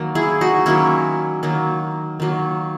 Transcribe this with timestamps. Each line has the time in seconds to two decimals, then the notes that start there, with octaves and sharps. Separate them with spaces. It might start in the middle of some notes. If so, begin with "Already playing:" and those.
Already playing: D#3 F#3 A#3
0.15 E4 G#4
0.41 D#4 F#4
0.66 D#3 F#3 A#3 C#4 E4
1.43 D#3 F#3 A#3
2.20 D#3 F#3 A#3